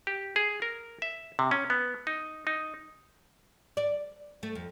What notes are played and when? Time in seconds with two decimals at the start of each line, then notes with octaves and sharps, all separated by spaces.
0.07 G4
0.36 G#4
0.62 A#4
1.02 E5
1.39 C3
1.51 C#4
1.70 B3
2.07 D#4
2.47 D#4
3.77 D5
4.43 A3
4.55 F2